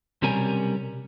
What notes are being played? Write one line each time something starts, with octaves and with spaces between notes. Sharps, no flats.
B1 C3 G3 C#4 A#4 G#5